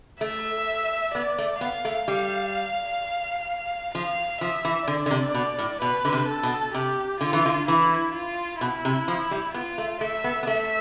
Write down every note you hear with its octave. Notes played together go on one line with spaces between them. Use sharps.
A3 E5
B3 D5
A3
B3 F5
A3
G3
F3 F5
F3 E5
E3
D3 D5
D3
C3
B2
A2
B2 B4
D3
C3
A4
B2
C3 G4
D3 F4
E3
D3
E3 E4
F4
B2 E4
C3
F3
G3
B3 F4
A3
A3 E5
B3
B3
A3 E5